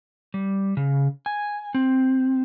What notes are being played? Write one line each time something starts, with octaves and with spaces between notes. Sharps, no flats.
G3
C#3
G#5
C4